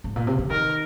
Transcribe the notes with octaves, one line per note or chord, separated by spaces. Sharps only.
G#2
A#2
C3
D3
D#3 A#4